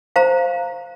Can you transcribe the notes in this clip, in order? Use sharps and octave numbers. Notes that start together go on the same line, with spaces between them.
C5 F5 A#5